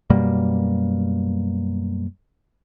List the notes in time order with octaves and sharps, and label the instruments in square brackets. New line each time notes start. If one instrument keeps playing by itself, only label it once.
[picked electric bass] F#2 B2 G3 A#3